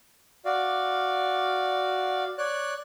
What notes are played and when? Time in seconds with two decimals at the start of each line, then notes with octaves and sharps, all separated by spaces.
0.45 F#4 D5 F5
2.38 C#5 D5 F#6